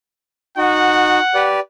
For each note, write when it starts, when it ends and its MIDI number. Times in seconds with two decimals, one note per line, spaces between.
0.57 1.19 63
0.57 1.19 66
0.57 1.50 78
1.34 1.60 67
1.34 1.60 71
1.34 1.60 74